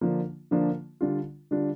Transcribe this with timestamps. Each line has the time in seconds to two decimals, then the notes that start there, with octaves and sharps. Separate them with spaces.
0.01 D3 F3 A#3 D4 F4
0.51 D3 F3 A#3 D4 F4
1.01 D3 G3 D4 F4
1.51 D3 G3 D4 F4